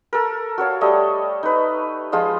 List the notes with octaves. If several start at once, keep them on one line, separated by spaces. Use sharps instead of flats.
A4 A#4
F#4 A4 C#5 F5
G3 A3 D#5
D#4 B4
F3 G#3 F4 D#5